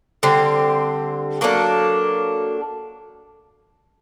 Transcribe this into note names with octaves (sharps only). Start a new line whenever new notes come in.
D3 G3 C4
F#3 A#3 D4 A4